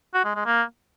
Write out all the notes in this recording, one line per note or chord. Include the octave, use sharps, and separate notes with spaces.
F#4
G#3
G#3
A#3